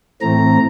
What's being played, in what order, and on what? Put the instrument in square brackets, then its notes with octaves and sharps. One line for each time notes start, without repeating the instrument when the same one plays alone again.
[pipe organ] A2 E3 A3 C4 A#5